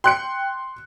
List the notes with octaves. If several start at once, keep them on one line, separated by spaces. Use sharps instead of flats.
G5 C6 F#6 C#7